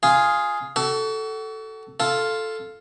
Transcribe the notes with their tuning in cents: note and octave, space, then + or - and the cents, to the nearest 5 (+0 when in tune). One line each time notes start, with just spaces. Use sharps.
F4 +0 G#4 +0
F#4 +35 A4 +0
F4 +0 A4 +0